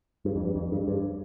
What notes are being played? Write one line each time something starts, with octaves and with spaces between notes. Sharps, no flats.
G2
F2
G2
F2
G2
G2